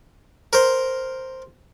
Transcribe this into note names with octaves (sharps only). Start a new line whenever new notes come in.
A#4 C5